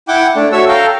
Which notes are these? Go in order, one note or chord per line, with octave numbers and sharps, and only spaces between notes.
E4 F#5 G5 D6
A3 D4
F#4 A4 C#5 E5 E6
A4 F5 G5 A#5